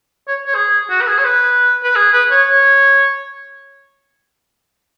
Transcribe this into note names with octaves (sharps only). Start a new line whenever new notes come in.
C#5
C#5
G#4
F#4
B4
G#4
C#5
B4
B4
G#4
B4
C#5
C#5